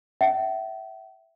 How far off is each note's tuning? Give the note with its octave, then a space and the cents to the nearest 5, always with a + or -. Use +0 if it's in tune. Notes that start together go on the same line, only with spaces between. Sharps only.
E5 +0 G5 -45